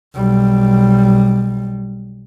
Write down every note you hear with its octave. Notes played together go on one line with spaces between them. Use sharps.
B1 G3